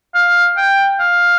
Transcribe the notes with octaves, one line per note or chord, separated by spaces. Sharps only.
F5
G5
F5